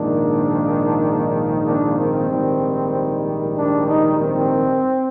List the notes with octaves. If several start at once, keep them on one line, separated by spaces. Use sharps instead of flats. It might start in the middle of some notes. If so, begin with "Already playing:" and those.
Already playing: A#1 G#2 D#3 A#3 D4
D4
C4
A#1 G#2 D#3 G3
D4
D#4
C4